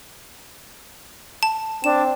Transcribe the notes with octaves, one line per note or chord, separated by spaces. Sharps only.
A5
C4 D4 E7